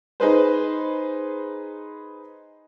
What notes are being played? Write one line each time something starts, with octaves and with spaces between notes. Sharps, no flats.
D#4 G#4 B4 C5